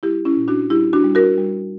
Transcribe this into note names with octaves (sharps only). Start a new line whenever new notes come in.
G3 E4 G4
C#4 E4
A#2
D4 F#4
G3 E4 G4
D4 F#4
G3
F#4 A#4
G3